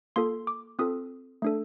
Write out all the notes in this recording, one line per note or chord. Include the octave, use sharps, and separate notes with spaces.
A#3 F4 A4 C6
D6
C4 F4 A4 D#6
A3 D4 A4